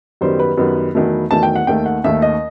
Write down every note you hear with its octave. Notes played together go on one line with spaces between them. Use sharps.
F#2 D#3 G3 B3 C5
B4
F#2 D#3 G3 B3
E2 D#3 F#3 A3
E2 D#3 F#3 A3 A5
G5
F#5
D#2 D#3 A3 G5
F#5
D#2 D#3 A3 E5
D#5